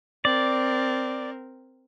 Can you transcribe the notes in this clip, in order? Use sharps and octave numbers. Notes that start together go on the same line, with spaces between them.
C4 A#4 D5